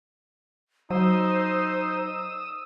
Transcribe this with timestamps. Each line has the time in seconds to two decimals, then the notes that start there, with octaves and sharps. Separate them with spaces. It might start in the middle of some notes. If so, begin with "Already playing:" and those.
0.90 F#3 D#4 C5 D#6 E6